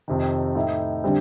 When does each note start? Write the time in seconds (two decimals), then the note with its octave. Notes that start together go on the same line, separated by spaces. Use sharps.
0.08 F2 C3 D#3
0.55 A2 A3 D#4
1.04 D3 G3 C4